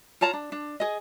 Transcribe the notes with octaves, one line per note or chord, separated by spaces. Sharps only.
F4 C#5 A5 A#5
D4
D4
G#4 D#5